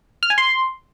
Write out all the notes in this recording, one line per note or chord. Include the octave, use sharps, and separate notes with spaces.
F6
G#5
C6